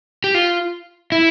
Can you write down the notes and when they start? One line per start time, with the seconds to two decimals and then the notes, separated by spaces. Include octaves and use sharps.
0.24 G4
0.35 F4
1.12 E4